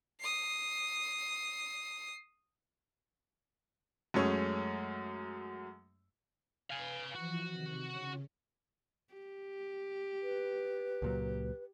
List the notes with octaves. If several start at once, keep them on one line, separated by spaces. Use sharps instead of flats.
D#6 C7
F#2 G#3 A3 C#4
B4 F5 G#5
E3 F3 F#4
C3 D#3
C#3 C#4
G4
B4
C#2 A#2 F#3